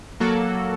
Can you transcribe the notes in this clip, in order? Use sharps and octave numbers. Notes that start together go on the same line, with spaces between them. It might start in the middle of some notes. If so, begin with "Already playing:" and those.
F#3 A#3 F#4 A4